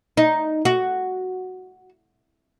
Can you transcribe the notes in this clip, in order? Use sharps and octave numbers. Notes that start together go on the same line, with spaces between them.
D#4
F#4